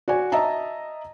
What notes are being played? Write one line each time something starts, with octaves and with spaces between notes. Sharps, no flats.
F#4 D5 G#5
D#5 E5 A5 A#5